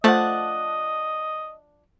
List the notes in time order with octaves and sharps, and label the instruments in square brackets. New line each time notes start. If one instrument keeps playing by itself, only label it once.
[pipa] F3 D4 [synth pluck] A3 [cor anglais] D#5 [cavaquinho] F#5 A5